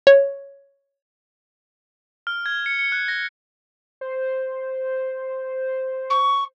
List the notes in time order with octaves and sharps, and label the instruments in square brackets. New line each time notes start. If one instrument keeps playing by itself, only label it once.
[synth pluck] C#5
[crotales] F6
G#6
C#7
C#7
F#6
A#6
[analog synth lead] C5
[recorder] C#6